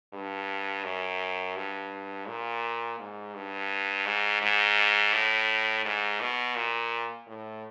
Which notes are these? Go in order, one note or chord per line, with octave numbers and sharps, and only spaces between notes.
G2
F#2
G2
A#2
G#2
G2
G#2
G#2
A2
G#2
B2
A#2
A2